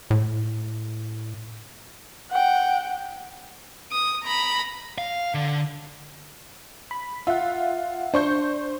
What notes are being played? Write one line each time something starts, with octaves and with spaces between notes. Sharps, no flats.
A2
F#5 G5
D#6
A#5 B5
F5
D3
B5
F4 E5 F#5
D4 C5 C#6 G6